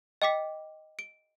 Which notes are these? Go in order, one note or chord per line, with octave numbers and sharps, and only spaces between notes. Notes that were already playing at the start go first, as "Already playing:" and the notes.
D#5 G5 D6 B6
D7